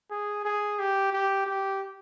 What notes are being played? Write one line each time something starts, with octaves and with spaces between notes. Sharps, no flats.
G#4
G#4
G4
G4
G4